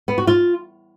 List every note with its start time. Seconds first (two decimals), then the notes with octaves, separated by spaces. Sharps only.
0.08 B3
0.18 F#4
0.27 F4